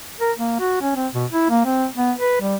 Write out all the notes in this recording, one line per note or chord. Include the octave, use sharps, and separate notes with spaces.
A#4
A#3
F#4
C#4
C4
B2
E4
A#3
C4
B3
B4
G3